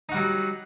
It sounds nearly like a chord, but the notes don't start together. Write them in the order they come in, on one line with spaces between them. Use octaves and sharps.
D#4 F#4 G3 F#3